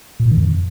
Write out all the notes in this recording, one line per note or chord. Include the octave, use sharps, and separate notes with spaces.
A#2
A2
D#3
F2